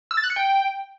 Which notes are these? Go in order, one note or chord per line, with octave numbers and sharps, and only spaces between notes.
E6
A6
F#6
C#7
G5